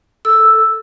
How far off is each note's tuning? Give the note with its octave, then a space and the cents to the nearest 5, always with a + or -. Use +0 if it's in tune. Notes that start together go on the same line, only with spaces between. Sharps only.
A4 +0 E6 +0